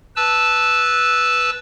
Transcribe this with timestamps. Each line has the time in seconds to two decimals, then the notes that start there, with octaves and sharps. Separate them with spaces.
0.16 B4 A5 E6